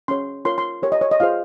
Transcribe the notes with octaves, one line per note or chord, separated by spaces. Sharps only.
C#4 G#4 C#5 C6
F4 A#4 C#5 C6
C6
G4 A#4 C#5
D#5
C#5
D#5
F4 G#4 C5 F5